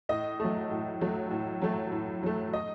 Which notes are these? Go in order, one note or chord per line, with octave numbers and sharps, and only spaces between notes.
A2 D#5
F#3 A3
A2
F#3 A3
A2
F#3 A3
A2
F#3 A3
D#5